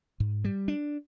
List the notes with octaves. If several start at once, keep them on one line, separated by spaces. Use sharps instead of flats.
G#2
G3
D4